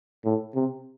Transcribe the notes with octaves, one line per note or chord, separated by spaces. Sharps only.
A2
C3